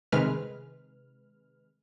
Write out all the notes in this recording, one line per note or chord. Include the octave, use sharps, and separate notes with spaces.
C3 D#3 G#3 B4 F6